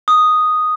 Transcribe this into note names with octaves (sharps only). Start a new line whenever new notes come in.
D#6